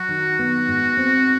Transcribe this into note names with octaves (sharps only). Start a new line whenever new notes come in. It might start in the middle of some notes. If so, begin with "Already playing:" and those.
Already playing: F#3 F#4
D#3
B3
G#2
C4